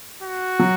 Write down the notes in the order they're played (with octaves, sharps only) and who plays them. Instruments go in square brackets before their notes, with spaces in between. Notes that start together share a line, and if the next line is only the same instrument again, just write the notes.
[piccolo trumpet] F#4
[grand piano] F#3